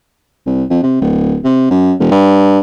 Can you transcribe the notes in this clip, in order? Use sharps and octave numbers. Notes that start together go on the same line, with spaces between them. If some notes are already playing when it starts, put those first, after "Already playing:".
C2
F2
C3
D1
C3
F#2
E1
G2